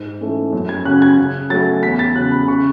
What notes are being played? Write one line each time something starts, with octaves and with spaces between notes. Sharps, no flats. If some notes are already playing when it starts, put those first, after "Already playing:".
Already playing: G#2
E3 A3 C#4
F#2
G#6
C#3 F#3 C#4 F#6
G#6
C#3
F#3 A3 C#4 A6
E2 B6
A6
C#3 F#3 F#6
B5
C#3 C#6